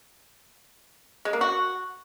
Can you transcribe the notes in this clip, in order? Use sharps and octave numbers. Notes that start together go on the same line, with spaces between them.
G#3
A#3
F#4